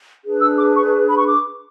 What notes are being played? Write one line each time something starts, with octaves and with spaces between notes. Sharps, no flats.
D4 G#4 B4
E6
D6
C#6
B5
C#6
D6